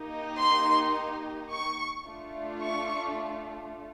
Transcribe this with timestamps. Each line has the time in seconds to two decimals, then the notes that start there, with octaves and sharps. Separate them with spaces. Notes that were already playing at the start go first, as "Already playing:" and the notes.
Already playing: A#3 D#4 G4
0.39 C6
1.51 C#6
2.06 A3 D4 F4
2.62 C#6